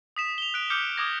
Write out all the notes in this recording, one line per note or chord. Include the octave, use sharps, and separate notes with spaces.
D#6 B6 E7
F7 G7
F#6 D7
D6 F6 G6 B6 C#7
D6 D#6 G#6 A#6